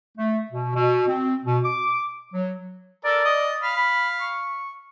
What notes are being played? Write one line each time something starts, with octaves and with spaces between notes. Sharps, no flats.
A3
B2
B2
C4
B2
D6
F#3
A4 A#4 D5
D#5
F5 B5
B5
C#6